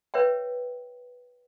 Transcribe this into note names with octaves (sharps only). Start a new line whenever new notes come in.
B4 C#5 E5 G5